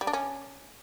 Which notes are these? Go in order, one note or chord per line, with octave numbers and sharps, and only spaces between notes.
G3
D4
C#4